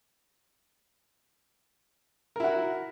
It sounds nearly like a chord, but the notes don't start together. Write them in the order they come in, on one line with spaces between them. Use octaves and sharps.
A#4 E4 F#4